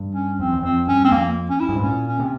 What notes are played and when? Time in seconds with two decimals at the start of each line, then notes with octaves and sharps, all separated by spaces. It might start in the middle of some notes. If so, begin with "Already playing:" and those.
Already playing: G2
0.14 C#4
0.39 F2 C4
0.53 E2
0.63 F2 C4
0.87 G2 C#4
1.04 C4
1.11 F2 A#3
1.49 C#4
1.59 E4
1.69 G2
1.76 G#2
1.83 A#2 C#4
2.07 C#4
2.20 C3